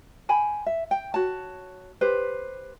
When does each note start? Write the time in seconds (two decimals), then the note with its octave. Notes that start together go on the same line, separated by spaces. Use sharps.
0.29 G5 G#5 B5
0.66 E5
0.91 G5
1.14 F#4 C#5 A5
2.01 G4 B4 C5